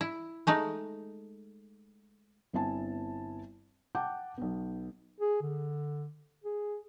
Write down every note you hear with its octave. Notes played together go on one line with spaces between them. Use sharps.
E4
G#3 A3 D#4
G1 B3 C4 E4 G#5 A5
F#5 G5 A5 D6 G6
B1 B3
G#4
D3
G#4